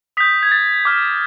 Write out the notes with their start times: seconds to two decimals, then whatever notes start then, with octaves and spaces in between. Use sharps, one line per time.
0.17 D#6 B6
0.20 G6
0.43 G#6
0.51 A6
0.85 D6 F6